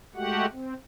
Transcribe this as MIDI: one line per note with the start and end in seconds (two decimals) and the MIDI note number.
0.15 0.46 56
0.15 0.46 57
0.15 0.46 66
0.15 0.46 67
0.15 0.46 78
0.52 0.74 60